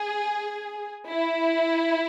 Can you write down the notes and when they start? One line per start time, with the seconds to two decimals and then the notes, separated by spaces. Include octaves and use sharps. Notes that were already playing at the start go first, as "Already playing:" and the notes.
Already playing: G#4
1.09 E4